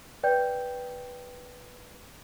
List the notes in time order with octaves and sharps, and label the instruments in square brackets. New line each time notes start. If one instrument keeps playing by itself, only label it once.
[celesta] B4 D5 G5 G6